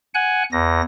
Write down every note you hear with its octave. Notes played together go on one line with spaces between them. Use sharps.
F#5 G#5 F#6
E2 A#6